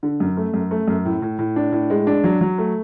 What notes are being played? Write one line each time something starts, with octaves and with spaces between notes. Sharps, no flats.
D3
F#2
A3
F#2
A3
F#2
A2
A2
A2
D4
A2
G#3
D4
F#3
F#3
A3